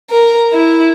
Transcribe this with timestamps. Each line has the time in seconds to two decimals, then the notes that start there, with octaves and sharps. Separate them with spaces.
0.10 A#4
0.53 E4